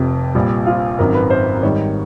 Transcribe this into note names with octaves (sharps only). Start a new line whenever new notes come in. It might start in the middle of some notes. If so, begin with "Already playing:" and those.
Already playing: F1 F2 C3 G4
A#1 A#2 G3
F4
G#1 F#2 D#3 F#3 A#4
B4
C5
G#2 D#3 G3 C#5